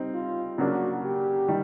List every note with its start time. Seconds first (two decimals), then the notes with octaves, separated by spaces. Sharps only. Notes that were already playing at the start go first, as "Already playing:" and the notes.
Already playing: G3 C4 D#4
0.14 F4
0.58 C#3 F#3 A#3 D4 F#4
1.04 G4
1.48 D#3 G3